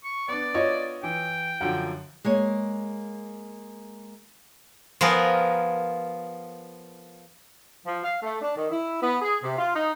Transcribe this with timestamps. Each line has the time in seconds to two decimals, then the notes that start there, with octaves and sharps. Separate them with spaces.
0.04 C#6
0.28 B3 D4 D5
0.54 F4 C#5 D#5
1.03 E3 G5
1.61 F#2 D3 F3 F#5
2.25 G#3 A#3 C#5
5.01 F3 B3 G#4 A#4
7.86 F3
8.04 F5
8.22 A3
8.41 D4
8.57 D#3
8.70 E4
9.02 B3
9.22 G#4
9.42 C3
9.59 F4
9.76 D#4